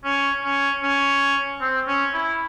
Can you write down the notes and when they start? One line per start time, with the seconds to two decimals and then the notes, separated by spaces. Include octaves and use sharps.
0.04 C#4
0.43 C#4
0.83 C#4
1.61 C4
1.87 C#4
2.14 E4